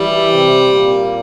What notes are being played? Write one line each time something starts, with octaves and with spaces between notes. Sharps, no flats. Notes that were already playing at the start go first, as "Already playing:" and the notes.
Already playing: E3 G3 E4
C3 C4
A#2 A#3